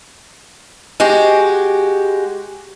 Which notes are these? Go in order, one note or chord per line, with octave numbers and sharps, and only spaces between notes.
G#3 F#4 G4